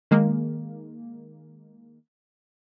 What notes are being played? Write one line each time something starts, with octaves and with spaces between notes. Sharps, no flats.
D#3 G#3 A#3